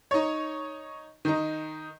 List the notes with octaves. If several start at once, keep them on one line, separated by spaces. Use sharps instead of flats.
D#4 C#5
D#3 D#4